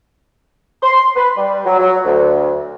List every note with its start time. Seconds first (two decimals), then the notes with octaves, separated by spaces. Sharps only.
0.81 C6
1.16 B4
1.37 G3
1.65 F#3
1.79 F#3
2.04 D2